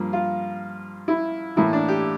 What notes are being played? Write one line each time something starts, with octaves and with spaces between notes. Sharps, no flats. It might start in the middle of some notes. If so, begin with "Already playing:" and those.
Already playing: G2 F3 A#3
F4
E4
A2 E3 A#3 E4
D4
G4